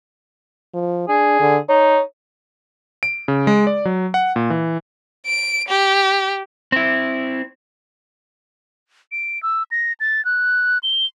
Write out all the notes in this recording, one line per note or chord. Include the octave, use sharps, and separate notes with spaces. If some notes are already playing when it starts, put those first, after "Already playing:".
F3
D4 G#4
D3
D#4 C#5
D7
C#3
G#3
D5
F#3
F#5
A#2
E3
D7
G4
C4 E4
D7
E6
A#6
A6
F#6
G7